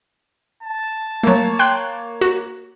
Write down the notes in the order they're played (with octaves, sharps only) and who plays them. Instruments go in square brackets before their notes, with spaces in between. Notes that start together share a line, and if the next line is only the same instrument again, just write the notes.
[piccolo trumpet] A5
[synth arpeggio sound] F#3 A3 [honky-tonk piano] A#3 C#5
[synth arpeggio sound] G5 C6 F#6
F#4